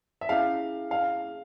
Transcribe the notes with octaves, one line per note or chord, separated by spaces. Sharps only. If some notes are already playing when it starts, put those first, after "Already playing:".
E5
C#4 E4 G#4 F5
F5